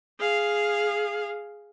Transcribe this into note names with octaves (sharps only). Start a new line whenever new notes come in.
G#4 F5